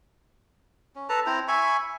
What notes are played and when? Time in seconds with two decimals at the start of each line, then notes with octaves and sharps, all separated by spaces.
0.96 C#4
1.09 A4 B4 A5 A#5
1.26 C4 E4 C5 A#5
1.48 E5 G#5 B5 C#6